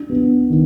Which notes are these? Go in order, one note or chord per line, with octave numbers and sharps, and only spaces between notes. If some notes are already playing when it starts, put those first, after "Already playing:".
Already playing: D4
B3
D#3